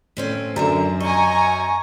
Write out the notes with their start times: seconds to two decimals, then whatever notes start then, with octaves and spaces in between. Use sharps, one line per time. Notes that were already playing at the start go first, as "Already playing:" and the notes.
0.17 A2 C4 C#4
0.56 F#2 D3 A#4 E5
1.00 D#5 G#5 A#5 C#6